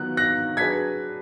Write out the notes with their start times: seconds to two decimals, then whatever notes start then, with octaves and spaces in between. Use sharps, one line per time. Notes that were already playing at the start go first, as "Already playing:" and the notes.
Already playing: D#3 F#3 B3 F4 F#6
0.17 F#6 A#6
0.57 F#3 D4 G#4 B4 G#6 B6